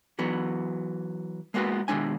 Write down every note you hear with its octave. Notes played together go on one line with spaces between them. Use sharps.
E3 F#3 B3
G#3 A#3 B3 F#4 B4
B2 D#3 G#3 D4 G#5